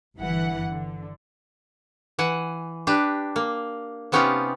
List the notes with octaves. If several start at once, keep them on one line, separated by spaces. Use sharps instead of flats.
G1 E3 F#5
D3
E3 F#5 G#5
D4 G4 B4
A#3
C3 B3 C#4 D#4 F4 G4